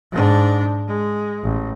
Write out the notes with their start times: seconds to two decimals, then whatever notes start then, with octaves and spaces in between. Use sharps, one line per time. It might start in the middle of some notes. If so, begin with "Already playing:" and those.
0.12 G#2 D4
0.87 G#3
1.43 A1